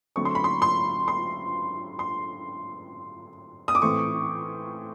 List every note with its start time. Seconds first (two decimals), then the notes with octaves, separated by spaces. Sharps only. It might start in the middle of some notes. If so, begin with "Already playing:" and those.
0.16 D3 F#3 A3 C4 C#6
0.25 C6
0.35 B5
0.44 C6
0.62 C6
1.08 C6
1.99 C6
3.68 D#6
3.75 D6
3.82 A2 E3 A3 C4 C#6